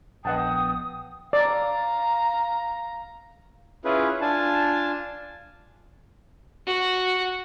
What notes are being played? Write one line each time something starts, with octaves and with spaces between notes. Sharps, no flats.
A#1 B3 D#5 F#5 G5 A5 D#6
D5 F5 A#5
C#4 E4 F4 G#4 B4
D4 F4 G#5 A5
F#4